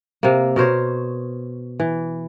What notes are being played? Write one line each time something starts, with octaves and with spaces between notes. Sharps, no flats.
C3 A#3
B2 A#4 C5 C#5
E3